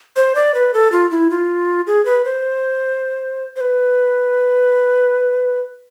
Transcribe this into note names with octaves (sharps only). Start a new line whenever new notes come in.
C5
D5
B4
A4
F4
E4
F4
G#4
B4
C5
C5
B4